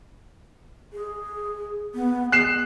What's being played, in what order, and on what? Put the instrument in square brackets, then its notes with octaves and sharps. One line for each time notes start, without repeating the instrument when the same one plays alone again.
[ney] G#4
B3
[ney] G#4 [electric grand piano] F#6 C7 E7